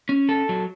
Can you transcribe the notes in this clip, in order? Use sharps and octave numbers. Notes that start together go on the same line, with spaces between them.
C#4
A4
F#3